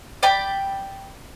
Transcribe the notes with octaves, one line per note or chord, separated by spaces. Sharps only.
D5 G5 B5 D6